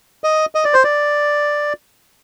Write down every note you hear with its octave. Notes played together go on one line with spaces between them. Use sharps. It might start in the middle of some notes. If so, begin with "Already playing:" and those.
D#5
D#5
D5
C5
D5